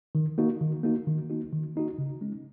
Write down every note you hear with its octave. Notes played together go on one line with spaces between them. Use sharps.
D#3
A#3 D#4 F#4
D#3
A#3 D#4 F#4
D#3
A#3 D#4 F#4
D#3
A#3 D#4 F#4
C#3
G#3 C#4